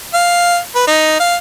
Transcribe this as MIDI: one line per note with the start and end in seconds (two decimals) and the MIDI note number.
0.14 0.58 77
0.75 0.84 71
0.87 1.19 63
1.20 1.36 77